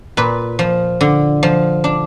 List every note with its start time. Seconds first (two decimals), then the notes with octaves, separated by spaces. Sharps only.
0.17 A#2 B4
0.59 F3
1.01 D3
1.43 F3
1.84 D4